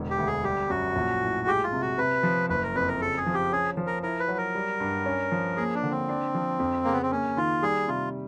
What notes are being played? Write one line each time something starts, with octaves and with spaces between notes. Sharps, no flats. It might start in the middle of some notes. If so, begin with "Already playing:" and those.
Already playing: E1 D3
G4
D2
G#4
G3 G4
F#2 F#4
A#1
A2
G#3 G4
F4
C3
F#4
C3 B4
F3
F#1 B4
A#4
F2 B4
A#4
C#3 A4
G#4
F3
G4
C#4 G#4
F3
A#4
E4 A#4
B4
F#3
A#4
G3
G2
C#4
F3
A#3 G#4
D4
D3
C4
D4
F3
F2
C#3 A#3
B3
C4
A#3 C#4
D#3 F4
G3 G#4
C3 F4